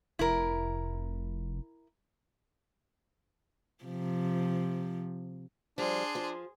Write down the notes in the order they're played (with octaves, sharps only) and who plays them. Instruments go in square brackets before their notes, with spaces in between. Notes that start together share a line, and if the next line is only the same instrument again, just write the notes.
[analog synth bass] F1 [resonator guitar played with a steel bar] E4 A#4
[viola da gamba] C3 F3
[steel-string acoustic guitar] F3 G3 [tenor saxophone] D4 [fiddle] G#4 C6
[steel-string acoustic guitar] F3